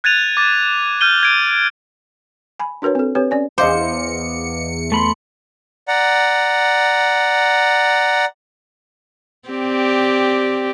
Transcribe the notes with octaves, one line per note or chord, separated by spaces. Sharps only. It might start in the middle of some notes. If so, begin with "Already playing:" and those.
F#6 G#6 A6 D#7 F7
D6 A6
F6 G6 D#7 G7
G#6 D7
G#5 B5
D4 F#4 A#4 B4 C#5
C4 A4
C4 G4 B4 C#5
C#4 D5 G#5
E2 C5 D#5 F5 D6 C#7
A3 B5 C6
D5 F#5 A#5
C4 G4 D5